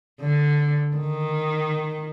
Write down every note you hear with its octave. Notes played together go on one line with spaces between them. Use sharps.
D3
D#3